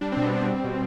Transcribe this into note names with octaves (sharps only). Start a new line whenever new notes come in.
G3 D4
B2 C4
B3
G3 C4
G3
B2